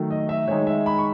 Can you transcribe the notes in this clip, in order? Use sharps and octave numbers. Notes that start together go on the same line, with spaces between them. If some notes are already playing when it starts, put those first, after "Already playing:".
Already playing: D#3 F#3 A3
D#5
E5
D#3 G#3 D#4 C#5
E5
B5
C#6